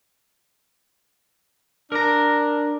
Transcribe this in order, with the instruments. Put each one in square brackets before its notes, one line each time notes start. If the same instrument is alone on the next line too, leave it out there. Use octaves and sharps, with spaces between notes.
[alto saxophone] D4 [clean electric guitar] A#4 A#5